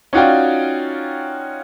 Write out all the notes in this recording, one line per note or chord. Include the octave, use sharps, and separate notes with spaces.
C#4 D#4 F4 F#4 D5 G5